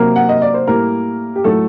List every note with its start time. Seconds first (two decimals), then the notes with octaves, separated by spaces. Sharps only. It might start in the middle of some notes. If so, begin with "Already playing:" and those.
Already playing: C3 F#3 A#3 A#4
0.16 F#5
0.29 D#5
0.42 D5
0.54 C5
0.67 A2 G3 A#3 A#4
1.36 G4
1.44 A2 F#3 A3 A4